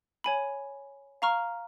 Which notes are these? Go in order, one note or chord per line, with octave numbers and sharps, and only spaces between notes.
C#5 G#5 B5
F5 A#5 C#6 F6